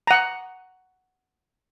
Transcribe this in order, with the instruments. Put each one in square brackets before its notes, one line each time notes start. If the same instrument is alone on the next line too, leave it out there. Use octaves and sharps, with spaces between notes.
[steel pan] F#5 A#5